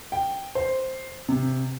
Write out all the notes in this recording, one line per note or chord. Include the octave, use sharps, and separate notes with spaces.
G5
C5
C3